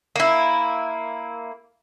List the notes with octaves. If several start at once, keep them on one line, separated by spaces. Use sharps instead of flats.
A#3 E4